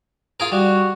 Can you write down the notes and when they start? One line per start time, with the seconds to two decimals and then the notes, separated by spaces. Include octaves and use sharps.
0.40 F4 G#4 A#4
0.52 G3 F#4